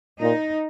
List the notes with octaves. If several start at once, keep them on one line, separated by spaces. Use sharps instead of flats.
A#2 D#4